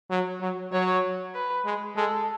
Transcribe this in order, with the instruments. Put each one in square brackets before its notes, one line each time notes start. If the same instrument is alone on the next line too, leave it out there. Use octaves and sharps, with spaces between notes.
[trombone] F#3
F#3
[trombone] F#3 [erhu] C#5
[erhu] B4
[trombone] G#3
[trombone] G#3 [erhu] A4